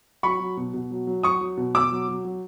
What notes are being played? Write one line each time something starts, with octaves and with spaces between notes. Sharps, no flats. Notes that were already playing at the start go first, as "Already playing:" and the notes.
F#3 B5 C#6
F#3
B2
B2
F#3
F#3
F#3 C#6 D#6
F#3
B2
B2 D6 E6
F#3
F#3
F#3